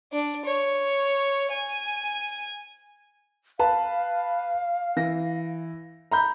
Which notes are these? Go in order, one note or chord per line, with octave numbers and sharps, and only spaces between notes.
D4
C#5
G#5
B4 F5 A5
E3 A#6
A#5 B5 G6